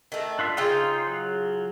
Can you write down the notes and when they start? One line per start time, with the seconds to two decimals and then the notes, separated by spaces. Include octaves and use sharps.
0.12 D#3 A3
0.39 D4 F4 E5
0.57 C#3 D#4 F4 C5 G5
1.07 F#3